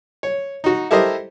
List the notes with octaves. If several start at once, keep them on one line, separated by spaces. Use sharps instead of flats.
C#5
D#4 F#4
E4 G4 A4 A#4 C5 D#5